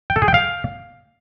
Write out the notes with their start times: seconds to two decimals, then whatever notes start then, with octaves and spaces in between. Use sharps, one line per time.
0.10 G5
0.16 A4
0.22 G#4
0.28 G5
0.34 F5